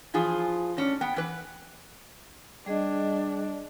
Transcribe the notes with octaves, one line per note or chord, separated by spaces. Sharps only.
E3 F3 F4 G#4
A2 C#4 D4
B3 G5
E3 B4
G3 D4 G#4 D#5